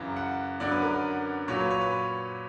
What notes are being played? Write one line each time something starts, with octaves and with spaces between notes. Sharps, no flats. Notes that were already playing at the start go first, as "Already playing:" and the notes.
Already playing: F#2 C#3 E3 A#5
F#5
F#2 D3 F#3 D5
B4
A#4
B4
A#2 F#3 C#5
B4
C#5
B4